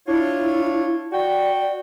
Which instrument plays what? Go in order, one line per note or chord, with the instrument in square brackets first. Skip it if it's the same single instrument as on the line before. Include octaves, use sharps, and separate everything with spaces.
[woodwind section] D4 F4 C#5 [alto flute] E4
[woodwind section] F#4 G5 [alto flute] D5